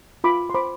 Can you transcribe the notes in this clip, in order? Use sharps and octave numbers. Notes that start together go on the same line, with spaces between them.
F4 B5 D6
C6
C5 B5 D6